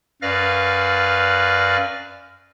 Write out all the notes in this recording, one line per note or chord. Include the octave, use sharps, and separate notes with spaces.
F#2 B4 D5 F5 F6 A#6